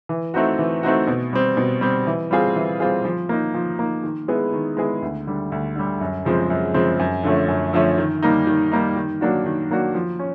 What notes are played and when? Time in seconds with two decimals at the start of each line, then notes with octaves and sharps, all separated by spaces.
0.09 E3
0.34 A3 C4 D#4 F#4
0.59 E3
0.83 A3 C4 D#4 F#4
1.08 B2
1.33 G3 C4
1.57 B2
1.81 G3 C4
2.07 E3
2.31 G3 C4 F4 G#4
2.56 E3
2.80 G3 C4 F4 G#4
3.05 F3
3.29 A#3 D#4
3.54 F3
3.79 A#3 D#4
4.04 D#3
4.28 G#3 B3 E4 G#4
4.53 D#3
4.77 G#3 B3 E4 G#4
5.02 D2
5.27 D3 G3
5.52 D2
5.76 D3 G3
6.01 F#2
6.25 C#3 F3 G#3 C4
6.50 F#2
6.74 C#3 F3 G#3 C4
6.99 F#2
7.23 D3 F3 A3 C#4
7.48 F#2
7.73 D3 F3 A3 C#4
7.98 D#3
8.22 G3 A#3 D#4
8.47 D#3
8.72 G3 A#3 D#4
8.96 D#3
9.21 F#3 A#3 D4 F#4
9.46 D#3
9.71 F#3 A#3 D4 F#4
9.95 F3
10.19 C#4